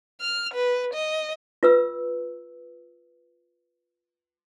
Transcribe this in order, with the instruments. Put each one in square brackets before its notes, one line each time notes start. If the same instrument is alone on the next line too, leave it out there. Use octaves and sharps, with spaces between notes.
[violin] F6
B4
D#5
[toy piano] F4 B4 E6